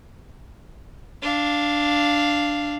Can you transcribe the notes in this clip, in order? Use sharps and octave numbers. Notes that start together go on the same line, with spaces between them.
D4 F5